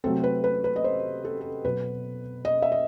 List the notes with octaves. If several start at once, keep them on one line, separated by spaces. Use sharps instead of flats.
C3 F#3 A3 C4 A4
B4
B4
B4
D#5
C5
A4
A4
B2 F#3 B3 B4
D#5
E5
D#5